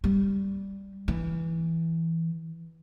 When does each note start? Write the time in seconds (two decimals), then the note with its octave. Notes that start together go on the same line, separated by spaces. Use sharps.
0.04 G3
1.08 E3